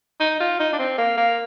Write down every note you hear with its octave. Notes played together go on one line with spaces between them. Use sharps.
D#4
F4
D#4
D4
C4
A#3
A#3